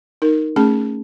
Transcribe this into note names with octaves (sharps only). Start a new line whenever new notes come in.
D#4 A#4
A3 C#4 G#4 A5